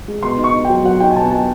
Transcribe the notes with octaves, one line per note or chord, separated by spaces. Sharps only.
G#3
B2 C6
D#4
C#6
D#4
F#3 G5
F#3 F#5
D#4 G5
G#5
B2 A5
F#3 A5